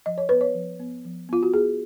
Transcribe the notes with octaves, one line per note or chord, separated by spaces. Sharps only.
F3 D#5
C#5
B3 B4
C#5
F3
B3
F3
B3 F4
F#4
B3 G#4